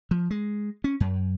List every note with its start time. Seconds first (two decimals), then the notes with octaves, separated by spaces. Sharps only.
0.11 F3
0.31 G#3
0.84 C#4
1.00 F#2